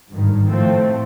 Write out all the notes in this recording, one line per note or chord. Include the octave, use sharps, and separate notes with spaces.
G#1 G2 D#3
A2 F3 A3 C4